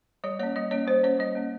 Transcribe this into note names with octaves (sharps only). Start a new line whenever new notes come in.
G3 C#5
A#3 C#4 C#5
G3 D#5
A#3 C#4 C#5
G3 C5
A#3 C#4 C#5
G3 D#5
A#3 C#4